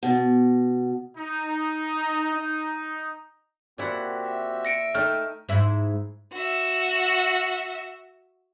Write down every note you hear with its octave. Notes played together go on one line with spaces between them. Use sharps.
B2
D#4
D#4
A#2 C4 E4 F#4 G4 F#5
E5
A#6 C#7 D7
A3 D#4 G5 F6
G#2 E4
F#4 E5